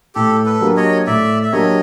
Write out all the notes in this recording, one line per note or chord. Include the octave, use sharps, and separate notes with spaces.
A2 G4 A4
A4 B4
F#3 A#3 D4 G4
C#5 D#5
A2 D5 E5
E5
F#3 A#3 D4 G4 C#5 D#5